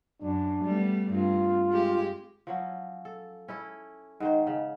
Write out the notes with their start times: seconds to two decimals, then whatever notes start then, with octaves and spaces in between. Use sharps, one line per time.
0.22 F#2 D4
0.65 G3 A3 B3
1.11 G2 C4 F4
1.71 G#3 G4
2.47 F3 F#3 C#4
3.05 A4
3.48 C#4 E4 A4
4.20 G#2 D#3 C5
4.47 C#3